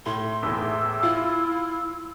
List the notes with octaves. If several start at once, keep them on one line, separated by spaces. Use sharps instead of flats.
A2 C6
E2 A2 E6
E4 F4